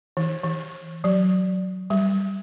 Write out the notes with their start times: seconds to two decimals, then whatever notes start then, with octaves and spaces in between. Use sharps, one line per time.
0.17 E3
0.43 E3
1.04 F#3
1.90 G3